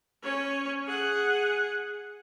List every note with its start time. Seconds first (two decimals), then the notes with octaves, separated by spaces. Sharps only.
0.23 C#4 C#5
0.84 G#4 F#5